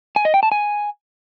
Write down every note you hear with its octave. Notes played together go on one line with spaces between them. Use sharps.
G#5
D#5
G5
A5
G#5